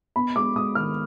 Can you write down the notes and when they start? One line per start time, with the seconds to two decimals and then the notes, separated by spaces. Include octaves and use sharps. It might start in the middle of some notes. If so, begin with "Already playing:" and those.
0.16 B3 B5
0.36 G#3 D6
0.56 G#3 D#6
0.75 D#3 F6